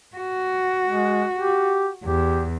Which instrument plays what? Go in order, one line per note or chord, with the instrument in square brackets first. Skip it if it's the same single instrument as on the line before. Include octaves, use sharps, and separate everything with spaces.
[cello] F#4
[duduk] G#3
G4
[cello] E2 [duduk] G4